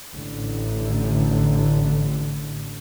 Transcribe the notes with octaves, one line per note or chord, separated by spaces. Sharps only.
A1 D3